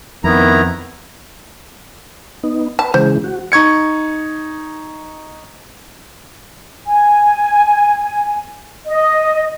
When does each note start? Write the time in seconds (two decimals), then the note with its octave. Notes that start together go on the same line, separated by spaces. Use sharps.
0.24 F2 D#3 B3 E4 A#5
2.43 B3 D#4
2.79 B4 A5
2.94 C#3 E3 G#3 C5
3.24 F#4
3.52 D#4 C#6 G#6 C#7
6.87 G#5
8.86 D#5